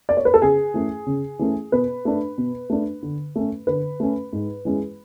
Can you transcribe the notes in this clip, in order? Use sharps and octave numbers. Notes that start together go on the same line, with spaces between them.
D5
C#5
B4
A4
C#3 G#4
E3 A3 C#4
C#3
E3 A3 C#4
B2 B4
A3 D4
B2
A3 D4
D3
A3 C#4
D3 B4
A3 C#4
G#2
E3 G#3 C#4